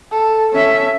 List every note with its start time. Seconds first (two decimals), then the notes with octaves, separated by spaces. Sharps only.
0.11 A4
0.53 C#4 A4 E5